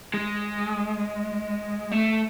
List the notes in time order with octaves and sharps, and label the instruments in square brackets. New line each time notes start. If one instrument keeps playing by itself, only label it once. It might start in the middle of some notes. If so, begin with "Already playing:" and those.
[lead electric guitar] G#3
A3